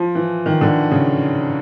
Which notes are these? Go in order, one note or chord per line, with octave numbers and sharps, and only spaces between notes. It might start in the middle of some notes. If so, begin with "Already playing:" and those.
Already playing: F3
E3
D#3
D3
C#3